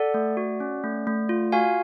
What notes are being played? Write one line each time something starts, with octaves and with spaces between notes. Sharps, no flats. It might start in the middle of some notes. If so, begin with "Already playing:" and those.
Already playing: A4 D5 F#5
A3
F#4
C#4
A3
A3
F4
F#4 F5 G#5